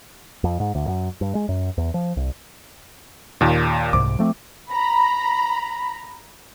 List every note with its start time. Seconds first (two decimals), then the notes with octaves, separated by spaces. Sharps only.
0.44 F2
0.60 G#2
0.75 D2
0.88 F#2
1.21 G2
1.35 G#3
1.49 F#2
1.78 E2
1.94 F3
2.17 C2
3.41 D#2 A#2
3.93 C2 G#2 C3 D6
4.19 F3 A3 C4
4.71 A#5 B5